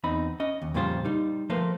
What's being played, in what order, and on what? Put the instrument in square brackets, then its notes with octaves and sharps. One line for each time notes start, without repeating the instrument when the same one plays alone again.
[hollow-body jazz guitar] E2 C4 D#4 B5
C#4 D#5
D#2
F2 A#2 C#3 G3 F4 C5
G3 D#4
F3 A3 A#3 B4 C5